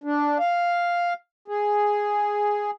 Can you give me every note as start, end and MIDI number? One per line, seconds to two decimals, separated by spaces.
0.04 0.38 62
0.39 1.13 77
1.48 2.71 68